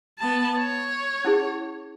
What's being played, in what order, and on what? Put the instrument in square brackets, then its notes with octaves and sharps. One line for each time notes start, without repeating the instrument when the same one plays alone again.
[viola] B3 A5
C#5
[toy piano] C#4 E4 G#4